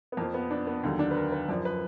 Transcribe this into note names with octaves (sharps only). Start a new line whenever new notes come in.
B3
F2 F3 A#3
B3
D4
B3
D#2 D3 F#3
D4
B4
A#4
B4
F#2 F3 D5
B4